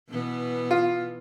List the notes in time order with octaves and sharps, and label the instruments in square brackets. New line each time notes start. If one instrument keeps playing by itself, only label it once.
[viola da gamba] B2 E3 B3
[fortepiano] F4